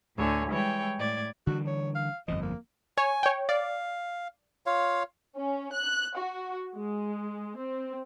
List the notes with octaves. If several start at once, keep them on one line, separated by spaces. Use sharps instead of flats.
D2 A2 D3 C#5 G#5
E3 G3 G#3 C#5 G5
A2 D5 G#6
D3 E3 G3 F#4
C#5
F5
G1 F2 F3 D#5
A#3
C#5 G#5
C#5 G5
D5 F5
F4 C#5 F5
C#4
F#6
F#4
G#3
C4